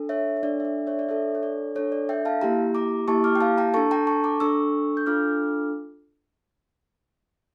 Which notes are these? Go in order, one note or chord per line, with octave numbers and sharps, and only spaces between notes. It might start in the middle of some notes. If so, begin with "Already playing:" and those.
Already playing: D4 A4
C#5 E5
C#5
D4 A4 D5
E5
D5
C#5 E5
D5
D4 A4 C#5 E5
C#5
D5
D4 A4 C#5
D5
E5 G5
F5 A5
A#3 E4 G4 G5 A#5
A#5 D6
A#3 E4 G4 A5 C#6
D6 F6
G5
F5 A5
G5 A#5
D4 A4 A5 C#6
G5 A#5
A5 C#6
A#5 D6
D4 A4 C#6 E6
G6
D4 F4 A4 D6 F6